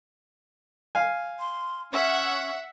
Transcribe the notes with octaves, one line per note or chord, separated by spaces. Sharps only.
F5 G#5
C6
C#4 E5 F#5